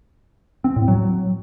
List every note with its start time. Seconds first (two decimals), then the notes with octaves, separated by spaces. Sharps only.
0.64 C4
0.76 A2
0.88 F#3